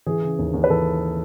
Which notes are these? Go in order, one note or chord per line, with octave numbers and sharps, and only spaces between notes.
E3 G#4
C#3
D#2
D#2
B4
E3 A4